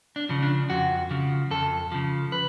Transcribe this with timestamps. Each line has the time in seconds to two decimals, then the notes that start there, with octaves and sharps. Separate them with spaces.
0.16 D4
0.29 C#3 F3
0.42 D4
0.70 F2 F#4
1.11 C#3 F3
1.51 F2 A4
1.92 C#3 F3
2.32 B4